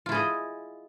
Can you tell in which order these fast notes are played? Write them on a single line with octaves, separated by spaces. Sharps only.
F4 E4 G#4 D#5